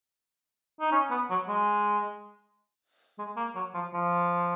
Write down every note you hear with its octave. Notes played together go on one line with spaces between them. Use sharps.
D#4
C#4
B3
F#3
G#3
G#3
A#3
F#3
F3
F3